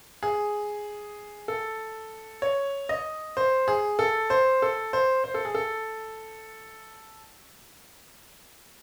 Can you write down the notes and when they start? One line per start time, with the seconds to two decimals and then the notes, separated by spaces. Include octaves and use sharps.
0.23 G#4
1.48 A4
2.42 C#5
2.89 D#5
3.37 C5
3.68 G#4
3.99 A4
4.30 C5
4.62 A4
4.93 C5
5.24 C5
5.34 A4
5.45 G#4
5.55 A4